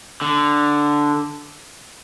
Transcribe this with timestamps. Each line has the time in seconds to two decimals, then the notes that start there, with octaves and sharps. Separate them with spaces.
0.21 D3